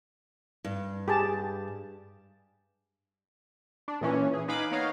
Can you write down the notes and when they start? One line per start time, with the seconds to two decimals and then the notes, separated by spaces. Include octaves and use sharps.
0.64 G2
1.08 G4 G#4 A5
3.88 D4
4.01 A#2 E3 C#4
4.34 G#4
4.48 D#4 B4 F5 G#5 B5 D6
4.71 A#3 B3 D#4 C#5 D#5 F5